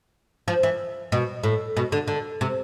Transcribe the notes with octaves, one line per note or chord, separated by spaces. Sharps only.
F3
E3
B2
A2
B2
D3
D3
C3